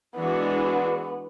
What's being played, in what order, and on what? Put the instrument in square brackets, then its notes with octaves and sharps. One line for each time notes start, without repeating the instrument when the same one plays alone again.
[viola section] E3 G#3 D4 F#4 [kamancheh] B3